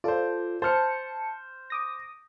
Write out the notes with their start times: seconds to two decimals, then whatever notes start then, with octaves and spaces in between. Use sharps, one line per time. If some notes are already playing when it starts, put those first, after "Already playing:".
0.04 F4 A4 C5 D5
0.62 C5 A5 F6 C#7
1.70 D6 D#6 A#6